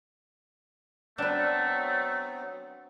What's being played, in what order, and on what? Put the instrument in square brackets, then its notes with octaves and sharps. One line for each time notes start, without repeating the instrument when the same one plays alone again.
[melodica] F#3 B3 C4 [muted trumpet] A3 [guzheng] D4 B4